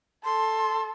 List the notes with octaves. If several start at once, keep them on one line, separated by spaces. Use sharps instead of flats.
A4 C6